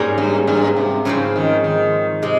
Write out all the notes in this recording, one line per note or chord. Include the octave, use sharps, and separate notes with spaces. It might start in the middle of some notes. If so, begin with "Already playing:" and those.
Already playing: G#2 G3 A#3 C#4 G#4
G2
G2
C3
G#2 C#3 F3 C4
D#3
D#3
C3 G#3